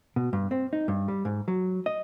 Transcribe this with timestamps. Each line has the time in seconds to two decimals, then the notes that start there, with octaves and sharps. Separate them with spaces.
0.16 B2
0.33 G2
0.51 C4
0.73 D#4
0.88 G2
1.08 G3
1.25 G#2
1.48 F#3
1.86 D#5